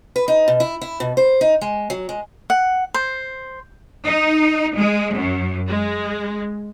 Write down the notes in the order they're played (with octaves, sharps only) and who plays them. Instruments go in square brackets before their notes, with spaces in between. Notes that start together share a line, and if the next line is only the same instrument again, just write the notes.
[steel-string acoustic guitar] B4
D#4
B2
E4
E4
B2
C5
D#4
G#3
F#3
G#3
[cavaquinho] F#5
C5
[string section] D#4
G#3
F#2
G#3